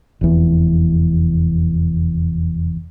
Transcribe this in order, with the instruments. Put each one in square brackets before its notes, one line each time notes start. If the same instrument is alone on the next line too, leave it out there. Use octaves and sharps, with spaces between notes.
[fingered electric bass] F1 E2